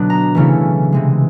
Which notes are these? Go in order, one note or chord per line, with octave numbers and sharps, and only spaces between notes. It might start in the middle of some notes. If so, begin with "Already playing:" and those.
Already playing: B2 D3 F#3 B3 D4
A#5
C#3 E3 A3 C#4 E4
C3 E3 G#3